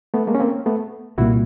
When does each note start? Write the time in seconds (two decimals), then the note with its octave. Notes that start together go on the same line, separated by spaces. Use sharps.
0.14 A3 B3
0.27 G#3 A#3
0.35 C#4
0.40 A#3 C4
0.66 A3 B3
1.18 C2 A#2 G3 A#3 E4 F#4